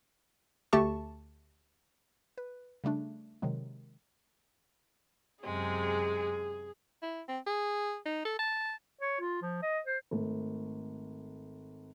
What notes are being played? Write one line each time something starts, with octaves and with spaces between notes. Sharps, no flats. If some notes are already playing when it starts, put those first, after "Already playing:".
D2 A3 G4 A5 C#6
B4
C#3 G3 A3 D4
C3 D#3 F#3 G#3
F#2 C3 G#3 G#4
E4
C4
G#4
D#4
A4
A5
C#5
F4
F3
D#5
C5
G#1 A3